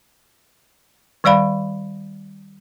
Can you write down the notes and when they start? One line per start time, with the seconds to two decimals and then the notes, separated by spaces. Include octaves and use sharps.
1.24 D#3 G3 D5 F5 B5